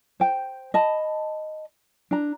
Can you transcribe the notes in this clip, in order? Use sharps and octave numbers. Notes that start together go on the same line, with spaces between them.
C5 G5
D#5 A5 B5
D4 A#5